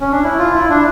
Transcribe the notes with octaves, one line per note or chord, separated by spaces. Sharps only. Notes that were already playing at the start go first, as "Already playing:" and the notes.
C#4
D4
E4
F4
E4
D4